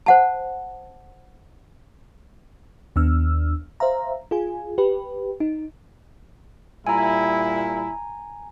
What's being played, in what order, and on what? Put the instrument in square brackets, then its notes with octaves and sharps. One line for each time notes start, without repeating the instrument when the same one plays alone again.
[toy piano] C5 F#5 A5
[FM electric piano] D#2 B3 D4 E6 F6
C5 E5 F5 A#5
F4 G#4 G#5
G4 B4
D#4
[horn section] A#2 G3 E4 [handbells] G#5 A#5